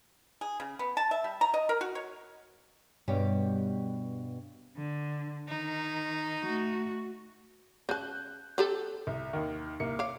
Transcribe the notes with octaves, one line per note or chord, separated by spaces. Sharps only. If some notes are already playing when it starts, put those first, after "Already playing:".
G#4
C#3
B3
A5
E5
G3
A#5
D#5
A#4
F#4
C#5
G2 B2 G3 G4 C#5
D3
D#3 D#4
A3 F#4
C#3 A5 F#6 G6
C4 G4 A4
C2
D#2 D#3
C2 A#3 C#7
C#5 F5 D6